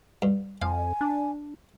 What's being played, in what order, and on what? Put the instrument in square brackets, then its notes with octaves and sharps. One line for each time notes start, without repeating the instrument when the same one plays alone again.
[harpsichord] G2
[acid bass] F2 [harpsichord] F5 [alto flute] G#5
[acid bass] D4